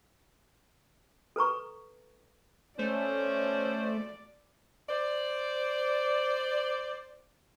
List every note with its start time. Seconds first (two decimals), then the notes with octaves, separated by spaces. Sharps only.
1.36 A4 B4 A#5 C#6
2.79 A3 C#4 C5 D5
4.89 C5 D5